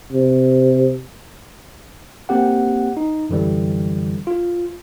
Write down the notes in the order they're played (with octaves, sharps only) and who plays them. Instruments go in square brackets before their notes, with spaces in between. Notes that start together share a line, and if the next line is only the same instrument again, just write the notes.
[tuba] C3
[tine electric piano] A#3 C4 G4 F#5
D#4
F#2 D3 E3 G3
F4